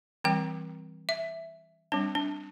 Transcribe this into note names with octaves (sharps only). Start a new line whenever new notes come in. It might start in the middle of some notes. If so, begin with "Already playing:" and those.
E3 G3 C4 G5
E5
G3 C4 D4
D4